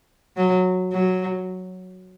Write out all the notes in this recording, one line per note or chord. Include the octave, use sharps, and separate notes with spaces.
F#3
F#3